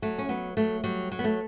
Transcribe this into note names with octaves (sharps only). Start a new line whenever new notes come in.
F#3 A3
C#4
F#3 B3
F#3 A3
F#3 G3
F#3
B3
A3